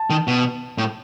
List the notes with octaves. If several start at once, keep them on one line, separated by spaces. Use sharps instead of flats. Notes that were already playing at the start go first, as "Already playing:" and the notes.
Already playing: A5
D#3
B2
A2